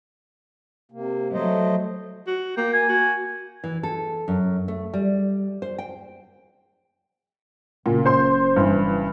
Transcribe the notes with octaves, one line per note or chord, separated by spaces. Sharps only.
C3 A#3
F#3 A3 C5 D#5
F#4
A#3 G5
G#5
F#4
E3
A4
F#2
A3
G3
C5
G5
F#1 A#2
C5 C6
G2 E3